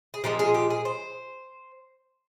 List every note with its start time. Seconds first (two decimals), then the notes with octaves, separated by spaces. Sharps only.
0.14 G#4
0.24 A#2 F3 G#3 G4
0.39 G#4
0.54 G4
0.70 G#4
0.85 C5